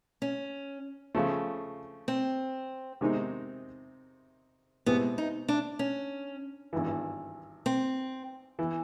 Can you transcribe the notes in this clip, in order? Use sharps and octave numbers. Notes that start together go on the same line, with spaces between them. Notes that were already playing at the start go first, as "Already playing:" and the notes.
C#4
C#3 F3 A3
C4
C3 D#3 G#3 C4 D#4
B2 G#3 B3 C4 E4 G4
D#4
D4
C#4
G#1 G2 E3
C4
E3